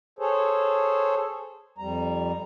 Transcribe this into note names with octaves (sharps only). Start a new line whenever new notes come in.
G#4 A4 C5 C#5
F2 G3 A#5